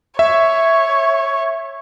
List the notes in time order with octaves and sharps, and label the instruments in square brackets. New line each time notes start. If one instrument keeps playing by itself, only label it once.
[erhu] C#5 [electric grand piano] E5